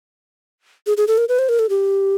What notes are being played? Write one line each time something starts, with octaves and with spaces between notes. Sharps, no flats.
G#4
G#4
A4
A#4
B4
C5
A#4
A4
G4